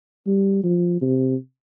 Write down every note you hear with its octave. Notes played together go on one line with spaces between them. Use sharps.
G3
F3
C3